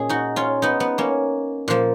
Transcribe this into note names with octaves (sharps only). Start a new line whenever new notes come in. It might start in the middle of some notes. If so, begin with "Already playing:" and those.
Already playing: A#2 G#3 C#4 G#4
D#4 F#4
C#4 F4
B3 D#4
B3
A#3 C#4
A#2 F3 A#3